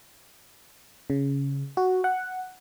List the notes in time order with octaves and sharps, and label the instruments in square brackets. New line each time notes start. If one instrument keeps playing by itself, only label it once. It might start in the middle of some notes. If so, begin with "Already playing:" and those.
[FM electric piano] C#3
F#4
F#5